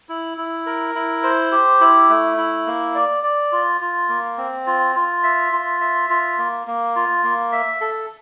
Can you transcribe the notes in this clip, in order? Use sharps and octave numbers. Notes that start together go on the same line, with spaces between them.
E4
E4
A#4
E4
C5
G4
E4
A3
E4
A#3
D5
D5
F4
F4
A#3
C4
F4
F4
E5
F4
E5
F4
A#3
A#3
F4
A#3
E5
A4